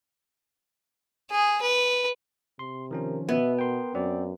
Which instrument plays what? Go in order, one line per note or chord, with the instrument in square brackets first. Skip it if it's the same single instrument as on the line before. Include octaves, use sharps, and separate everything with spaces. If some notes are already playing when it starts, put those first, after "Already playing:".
[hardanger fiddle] G#4
B4
[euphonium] C3 [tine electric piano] C6
[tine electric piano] D#3 F3 C#4 [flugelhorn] A#4
[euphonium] B2 [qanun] B3 [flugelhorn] E5
[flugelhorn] A#4 [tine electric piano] G5 C6
[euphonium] F#2 [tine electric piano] C4 [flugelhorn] D5